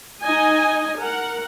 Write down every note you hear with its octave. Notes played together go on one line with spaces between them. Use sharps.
D#4 D#5 G#5
A#4 F#5